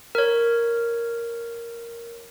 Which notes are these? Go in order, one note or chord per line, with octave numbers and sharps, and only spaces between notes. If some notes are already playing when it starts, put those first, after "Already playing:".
A#4 C#5